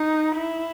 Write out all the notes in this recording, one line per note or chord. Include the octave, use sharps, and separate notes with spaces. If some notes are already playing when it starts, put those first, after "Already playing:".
Already playing: D#4
E4